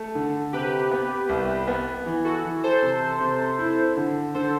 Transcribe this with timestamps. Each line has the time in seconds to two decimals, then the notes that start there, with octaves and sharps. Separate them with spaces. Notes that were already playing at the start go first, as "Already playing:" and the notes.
Already playing: A3
0.15 D3
0.53 C3 G4 B4
0.91 B3
1.29 C2
1.68 B3
2.06 E3
2.24 F#4 A4
2.44 E3
2.64 A4 C5
2.82 C3
3.21 C3
3.59 E4
3.97 D3
4.34 D3 A4 C5